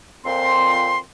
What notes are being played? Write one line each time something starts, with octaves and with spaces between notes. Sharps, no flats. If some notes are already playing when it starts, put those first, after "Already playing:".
F2 A#2 F3 C4 C6